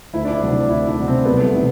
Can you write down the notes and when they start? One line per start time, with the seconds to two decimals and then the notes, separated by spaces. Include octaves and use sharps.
0.13 D2 E4
0.25 D4
0.33 E4
0.42 C3 F#3
0.51 D4
0.69 D2 E4
0.88 D4
0.98 C3 F#3
1.08 C4
1.26 C2 B3
1.44 A3
1.54 C3 E3